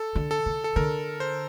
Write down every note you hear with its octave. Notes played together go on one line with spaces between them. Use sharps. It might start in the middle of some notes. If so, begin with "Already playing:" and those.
Already playing: A4
D3
A4
D3
A4
D3 A#4
C5